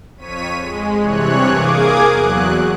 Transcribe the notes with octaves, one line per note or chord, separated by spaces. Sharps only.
F2 C#5 B6 D#7
G#3
G2 C3 E3 C#5 F#6
A#3 G#4 D6 D#6 G#6
E2 F#3 F#6